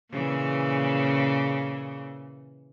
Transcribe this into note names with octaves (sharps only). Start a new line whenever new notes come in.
A#2 C#3 E3